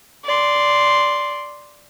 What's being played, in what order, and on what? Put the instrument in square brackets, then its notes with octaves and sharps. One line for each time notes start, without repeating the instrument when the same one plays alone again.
[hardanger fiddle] D5 C6